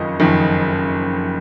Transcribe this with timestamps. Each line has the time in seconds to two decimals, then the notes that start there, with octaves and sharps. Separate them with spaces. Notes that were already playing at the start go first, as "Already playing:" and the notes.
Already playing: F#1 F2 D#3 D#5
0.20 F#1 F2 D#3